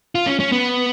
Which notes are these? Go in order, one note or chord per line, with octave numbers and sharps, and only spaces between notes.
F4
C#4
C#4
B3